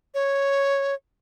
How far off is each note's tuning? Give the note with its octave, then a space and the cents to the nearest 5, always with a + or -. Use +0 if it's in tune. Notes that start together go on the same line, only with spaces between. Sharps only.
C#5 -5